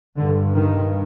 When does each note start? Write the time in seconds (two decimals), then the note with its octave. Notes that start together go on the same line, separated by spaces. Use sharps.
0.18 G2 D3
0.54 D#3